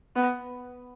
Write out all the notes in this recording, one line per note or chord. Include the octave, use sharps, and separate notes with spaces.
B3